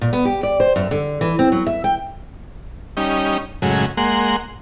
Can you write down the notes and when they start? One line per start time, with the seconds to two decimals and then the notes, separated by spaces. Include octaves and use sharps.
0.01 A#2
0.13 B3
0.25 G4
0.43 D5
0.60 C5
0.76 F#2
0.91 D3
1.21 E3
1.39 C4
1.52 F#3
1.67 E5
1.84 G5
2.97 G3 C#4 D#4
3.62 F#2 A2 C#3 F#3 G#3
3.97 G#3 A#3 F#5 C6